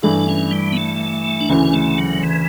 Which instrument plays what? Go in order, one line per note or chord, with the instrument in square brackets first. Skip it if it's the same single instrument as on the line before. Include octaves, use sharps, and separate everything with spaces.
[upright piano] G2 E3 A3 E4 [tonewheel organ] D4
[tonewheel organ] C#4
G3
B3
A3
D4
[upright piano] D2 C#3 E3 [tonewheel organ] C#4
[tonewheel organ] A3
F#3
E3